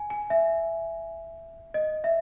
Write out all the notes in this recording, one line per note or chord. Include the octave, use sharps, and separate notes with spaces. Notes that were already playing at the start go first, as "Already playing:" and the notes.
Already playing: G#5
G#5
E5
D#5
E5